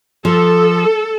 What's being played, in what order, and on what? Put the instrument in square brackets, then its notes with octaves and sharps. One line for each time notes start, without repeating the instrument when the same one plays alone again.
[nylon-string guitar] F3 [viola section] A4